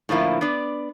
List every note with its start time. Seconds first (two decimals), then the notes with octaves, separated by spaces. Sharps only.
0.09 A2 D3 F3 A#3 E4
0.41 B3 D4 D5